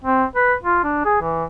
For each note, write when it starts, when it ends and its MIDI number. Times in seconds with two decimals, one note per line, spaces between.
0.05 0.25 60
0.36 0.54 71
0.63 0.80 65
0.83 1.02 62
1.05 1.19 68
1.21 1.44 52